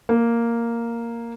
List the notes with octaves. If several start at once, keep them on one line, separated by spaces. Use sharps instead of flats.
A#3